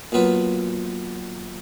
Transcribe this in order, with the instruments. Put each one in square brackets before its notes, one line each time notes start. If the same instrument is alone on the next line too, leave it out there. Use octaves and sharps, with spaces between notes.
[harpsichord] A#2 F#3 B3 F4 B4